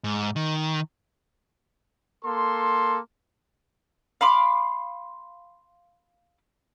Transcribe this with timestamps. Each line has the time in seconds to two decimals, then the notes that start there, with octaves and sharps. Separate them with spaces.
0.04 G#2
0.36 D#3
2.25 A#3 A4 C6
4.21 F5 B5 C6 D6